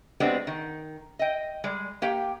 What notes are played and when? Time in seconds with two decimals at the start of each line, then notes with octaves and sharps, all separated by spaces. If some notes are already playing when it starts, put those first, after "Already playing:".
0.20 G#3 B3 C4 D4 F#4 G4
0.47 D#3
1.19 D#5 G5
1.64 G3 G#3
2.02 A#3 G4 G5